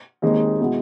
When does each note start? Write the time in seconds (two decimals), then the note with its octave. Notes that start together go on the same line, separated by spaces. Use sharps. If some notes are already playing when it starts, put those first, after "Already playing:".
0.22 D#2 D#3 G#3 C4 D#4
0.60 B2 G#3 B3 E4